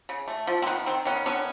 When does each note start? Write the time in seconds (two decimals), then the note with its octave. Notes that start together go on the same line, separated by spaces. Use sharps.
0.09 C#3
0.28 A3
0.47 F3
0.62 C4
0.67 D#3 B3
0.86 D#3 C4
1.05 D#3 B3 C#4
1.26 D3 B3 C#4